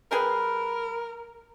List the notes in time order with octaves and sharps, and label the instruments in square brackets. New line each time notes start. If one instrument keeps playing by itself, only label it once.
[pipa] G3 G#4 B4 [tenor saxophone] A#4